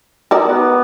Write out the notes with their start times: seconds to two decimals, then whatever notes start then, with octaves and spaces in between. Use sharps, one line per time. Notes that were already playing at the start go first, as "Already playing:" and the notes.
0.31 D#4 A#4 D5
0.45 B3